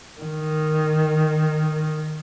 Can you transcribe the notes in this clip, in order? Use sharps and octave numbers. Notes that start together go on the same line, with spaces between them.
D#3